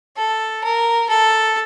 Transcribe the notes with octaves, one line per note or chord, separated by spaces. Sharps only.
A4
A#4
A4